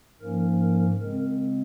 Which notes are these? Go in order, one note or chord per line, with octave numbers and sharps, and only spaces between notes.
G#2 F3 A#3 C#4 A#4
A#4
C#3 G#3 C4 A#4